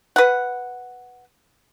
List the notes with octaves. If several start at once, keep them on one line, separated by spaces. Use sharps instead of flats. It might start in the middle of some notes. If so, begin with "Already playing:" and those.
B4 F#5